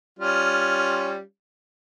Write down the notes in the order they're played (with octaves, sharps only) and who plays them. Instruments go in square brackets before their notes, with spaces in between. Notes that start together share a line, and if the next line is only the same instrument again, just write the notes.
[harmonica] G3 C#4 F4